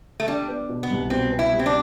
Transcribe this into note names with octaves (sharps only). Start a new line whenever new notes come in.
A3
G3 D4
B3
B2
B3
C2
B2 C4
B3
E4
G3
C4
D4